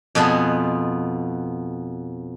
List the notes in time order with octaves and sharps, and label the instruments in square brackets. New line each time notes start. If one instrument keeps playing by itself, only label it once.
[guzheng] F2 B2 B3 F4 G#4